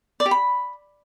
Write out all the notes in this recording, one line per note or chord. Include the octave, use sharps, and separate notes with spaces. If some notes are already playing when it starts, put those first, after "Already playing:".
D5
G4
B5